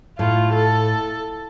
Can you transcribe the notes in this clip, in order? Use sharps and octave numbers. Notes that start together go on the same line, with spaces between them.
A2 F4
A4